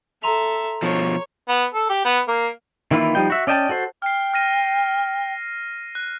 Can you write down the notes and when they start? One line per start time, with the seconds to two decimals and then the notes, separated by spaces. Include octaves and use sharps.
0.23 A4 E5 A#5 C6 F7
0.82 B2 F3 C#5
1.49 B3
1.74 A4
1.90 G4
2.05 B3
2.28 A#3
2.91 D#3 E3 A#3 E4 F4
3.15 F3 G3 D#4 G5
3.30 F#4 E5
3.47 C#4 D5 D#5 G5 A5
3.69 F#4 A4 C5
4.02 G5 F6 C7
4.34 F6 A#6 D#7
5.95 F#6